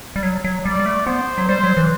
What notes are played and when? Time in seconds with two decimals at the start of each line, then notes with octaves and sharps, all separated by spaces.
0.16 G3
0.23 F#3
0.44 F#3
0.65 G3 D5
0.80 G3
0.86 A3
1.07 B3 C5
1.38 F#3
1.48 G3 C5
1.64 F#3
1.77 E3